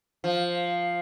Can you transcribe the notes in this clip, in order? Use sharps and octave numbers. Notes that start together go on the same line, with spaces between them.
F3